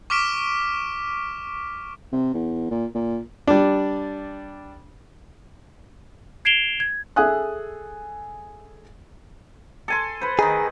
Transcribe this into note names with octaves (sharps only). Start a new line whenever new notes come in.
C#6 D6 F6 B6 D7 E7
C3
E2
A#2
A#2
G3 D4
G#6 C7 D7 E7 F7 G7
G#6
G#4 A4 E5 G#5 D#6 F#6
A4 G#5 C6
B4 C5
D#3 D#4 G#4